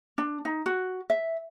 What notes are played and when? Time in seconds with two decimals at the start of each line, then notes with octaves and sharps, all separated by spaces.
0.18 D4
0.45 D#4
0.66 F#4
1.10 E5